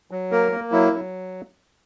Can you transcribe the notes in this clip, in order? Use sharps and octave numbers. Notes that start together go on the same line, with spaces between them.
F#3
A#3 A#4
A#3
F#3 E4
F#3